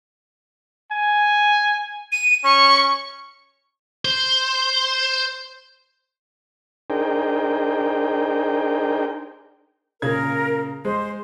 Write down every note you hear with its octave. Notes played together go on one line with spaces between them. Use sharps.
G#5
D#7
C#4 C#6
C5
D4 D#4 G#4 A#4 C5 G5
A#2 C#3 A#4 G#6
G#3 C5